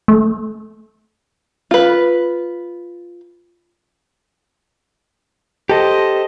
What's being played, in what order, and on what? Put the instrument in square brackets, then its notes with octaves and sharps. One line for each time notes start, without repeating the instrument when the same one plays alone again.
[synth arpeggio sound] A3
[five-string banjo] F4 B4
[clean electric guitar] G4 A4 [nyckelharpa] C5 D#5